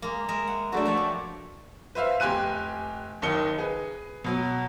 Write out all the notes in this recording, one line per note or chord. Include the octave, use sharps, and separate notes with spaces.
G#3 A#3
G#3 A#4 E5
F#5
F#3 A3 D4 F#4 E5
F3 C#5 D5
G4
B4 C5 E5 F5
F1 G4 G#5 C6 F#6 D#7
F#1 D#2 D#4 C#7 G7
G#4 B4
B2 F#3